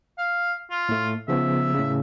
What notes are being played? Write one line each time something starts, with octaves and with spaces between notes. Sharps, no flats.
F5
F4
A2 A3
C#3 F3 B3 E5
A2 C#3